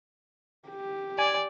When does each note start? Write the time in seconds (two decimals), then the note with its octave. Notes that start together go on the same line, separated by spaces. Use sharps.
0.68 G4
1.19 D5 G#5